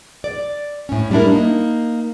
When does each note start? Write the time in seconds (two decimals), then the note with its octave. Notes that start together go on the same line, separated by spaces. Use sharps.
0.24 D5
0.89 A2 C#4
1.11 G3 A3 D4 E4 A#4
1.32 A#3 D#4